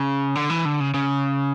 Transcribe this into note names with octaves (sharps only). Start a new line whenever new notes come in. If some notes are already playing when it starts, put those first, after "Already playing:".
Already playing: C#3
D3
E3
D3
C#3
C#3